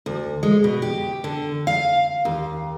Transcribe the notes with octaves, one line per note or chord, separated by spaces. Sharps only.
D2
G#3
B2
G4
D3
F5
D#2